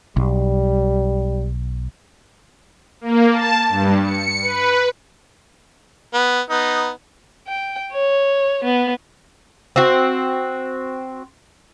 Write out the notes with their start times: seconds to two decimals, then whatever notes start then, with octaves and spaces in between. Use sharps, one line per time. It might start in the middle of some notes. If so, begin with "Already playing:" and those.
0.17 B1 G3
3.01 A#3
3.31 A5
3.69 G2
4.02 C#7
4.41 B4
6.14 B3
6.50 B3 D#4
7.48 G5
7.92 C#5
8.64 B3
9.76 C4 F#4